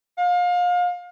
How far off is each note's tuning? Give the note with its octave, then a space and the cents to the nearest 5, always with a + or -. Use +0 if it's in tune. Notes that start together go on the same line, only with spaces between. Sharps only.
F5 +30